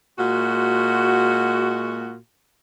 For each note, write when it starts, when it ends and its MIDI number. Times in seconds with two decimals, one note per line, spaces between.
0.18 2.14 46
0.18 2.14 56
0.18 2.14 66